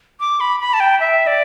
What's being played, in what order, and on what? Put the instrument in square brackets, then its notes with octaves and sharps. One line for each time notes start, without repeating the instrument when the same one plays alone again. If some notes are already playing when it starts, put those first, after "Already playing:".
[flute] D6
B5
B5
A5
G5
E5
D5